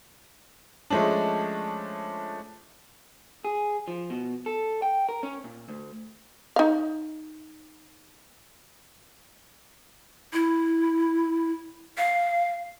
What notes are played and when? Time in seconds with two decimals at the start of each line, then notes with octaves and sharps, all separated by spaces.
0.90 F3 G#3 A3 C#4 D4
3.45 G#4
3.88 F3
4.10 B2
4.46 A4
4.82 G5
5.09 A#4
5.23 C#4
5.44 A#2
5.69 D2
6.56 D#4 F5
10.33 E4
11.98 F5